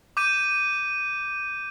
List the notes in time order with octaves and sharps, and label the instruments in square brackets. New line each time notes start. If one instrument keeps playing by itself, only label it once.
[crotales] D6 G6 D#7